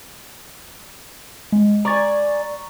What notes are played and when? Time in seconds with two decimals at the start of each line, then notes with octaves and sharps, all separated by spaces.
1.52 G#3
1.85 D5 G#5 A#5 C#6 A6